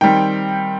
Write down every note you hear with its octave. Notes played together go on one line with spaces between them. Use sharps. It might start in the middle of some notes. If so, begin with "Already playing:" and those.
D#3 G3 C4 G5